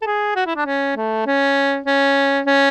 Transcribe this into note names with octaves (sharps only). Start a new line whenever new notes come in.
A4
G#4
F#4
E4
D4
C#4
A3
C#4
C#4
C#4